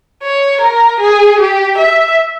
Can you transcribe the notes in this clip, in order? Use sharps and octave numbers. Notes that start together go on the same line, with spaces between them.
C#5
A#4
G#4
G4
E5